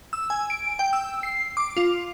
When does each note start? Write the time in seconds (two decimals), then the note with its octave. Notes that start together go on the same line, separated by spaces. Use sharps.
0.13 E6
0.30 G#5
0.50 D7
0.79 G5
0.93 E6
1.23 C7
1.57 D6
1.77 F4